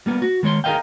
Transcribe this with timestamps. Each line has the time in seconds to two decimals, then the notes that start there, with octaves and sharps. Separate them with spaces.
0.06 G3 A#3 B3
0.22 F#4
0.43 D#3 G#3 C#5 C6
0.64 G#4 A#4 C5 D#5 F5 G5